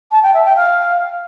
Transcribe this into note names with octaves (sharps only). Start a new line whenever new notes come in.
A5
G5
E5
G5
F5